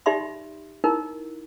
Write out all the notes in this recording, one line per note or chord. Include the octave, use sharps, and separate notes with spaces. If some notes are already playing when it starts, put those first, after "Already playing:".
D#4 G4 D5 E5 B5 C6
D#4 E4 A#4